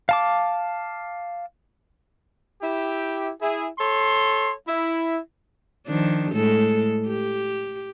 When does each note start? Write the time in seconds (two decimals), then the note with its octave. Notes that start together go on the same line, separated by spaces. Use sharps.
0.09 F5 A5 D6
2.62 E4 G4
3.42 E4 G#4
3.79 A4 C#5 C6
4.68 E4
5.87 D#3 F3 D4
6.32 A2 G#3 A4
7.07 G4